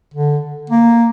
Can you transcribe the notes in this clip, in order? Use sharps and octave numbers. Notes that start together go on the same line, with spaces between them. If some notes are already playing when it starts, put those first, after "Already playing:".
D3
A#3